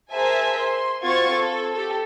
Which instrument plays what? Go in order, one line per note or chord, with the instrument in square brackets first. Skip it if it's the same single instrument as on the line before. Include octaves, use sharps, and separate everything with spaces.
[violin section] G#4 A#4 C5 E5 G#5 A5
C6
C4 F4 F#4 C#6 G#6 A6
A4
G4 A4